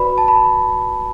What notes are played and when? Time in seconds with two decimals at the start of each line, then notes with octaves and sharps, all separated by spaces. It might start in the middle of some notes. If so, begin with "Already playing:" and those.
Already playing: F#4 B4 D5 B5
0.18 A5
0.28 B5